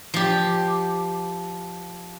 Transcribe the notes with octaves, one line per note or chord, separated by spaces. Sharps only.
F3 G4